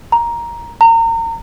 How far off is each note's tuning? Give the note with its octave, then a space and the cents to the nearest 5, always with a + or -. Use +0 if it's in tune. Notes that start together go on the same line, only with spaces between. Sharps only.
A#5 +10
A#5 -30